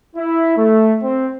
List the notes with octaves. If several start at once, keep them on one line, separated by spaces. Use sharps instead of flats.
E4
A3
C4